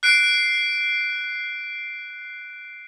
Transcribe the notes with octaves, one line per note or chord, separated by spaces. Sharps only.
F#6 C7 D7